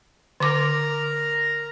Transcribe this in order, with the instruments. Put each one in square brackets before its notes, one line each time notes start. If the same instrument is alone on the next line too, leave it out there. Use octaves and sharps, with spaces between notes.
[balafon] D3 D6 [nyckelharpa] A#4 A#5